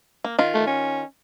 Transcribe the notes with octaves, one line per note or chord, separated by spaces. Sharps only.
A#3
D#3 F4
A3
C#4